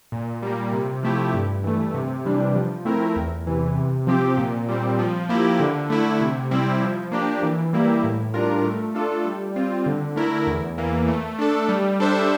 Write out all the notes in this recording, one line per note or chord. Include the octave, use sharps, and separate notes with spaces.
A#2
G3 A#3
C3
F3 A3 E4 G4
G2
E3 A3
C3
E3 G3 D4
F3
A3 C4 E4 A#4
E2
C3 E3
C3
F3 C4 G4
A#2
G3 C4
F3
A#3 E4 G4
D3
A3 E4
C3
G3 C4 E4
F3
A#3 D4 G4
E3
G3 A#3 E4 G4
A2
G3 D4 F4 A#4
A3
D4 F4 A4
G3
C4 F4
D3
A3 E4 A#4
E2
E3 A#3
A3
D4 A4
G3
D4 A4 C5 E5